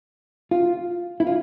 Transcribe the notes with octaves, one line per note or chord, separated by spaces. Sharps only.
F4
E4
F4